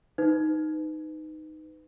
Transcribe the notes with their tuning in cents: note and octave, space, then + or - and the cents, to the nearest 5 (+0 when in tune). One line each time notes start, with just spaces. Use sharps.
D#4 +0 B4 +25